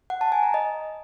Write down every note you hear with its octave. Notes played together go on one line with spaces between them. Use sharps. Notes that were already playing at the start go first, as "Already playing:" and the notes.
F#5
A5
G#5
A#5
D#5